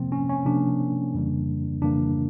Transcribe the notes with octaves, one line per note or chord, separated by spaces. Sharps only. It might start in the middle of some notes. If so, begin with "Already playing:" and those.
Already playing: C3 F3 A#3 C4
C#4
C#4
C3 F3 A#3 D4
F2 C#3 E3 G3 A#3
F2 C#3 E3 G3 A#3 D4